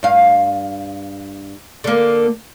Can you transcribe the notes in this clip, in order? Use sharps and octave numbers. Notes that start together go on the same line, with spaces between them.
G2 F5
D3 A#3